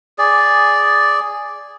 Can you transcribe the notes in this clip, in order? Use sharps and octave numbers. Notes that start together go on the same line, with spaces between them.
G#4 D5